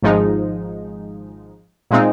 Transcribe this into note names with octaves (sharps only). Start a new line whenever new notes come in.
G#1 G#2 F3 G#3 D#4
A#2 G#3 C4 D#4